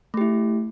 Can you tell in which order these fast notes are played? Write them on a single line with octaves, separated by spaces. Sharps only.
A3 G4 E4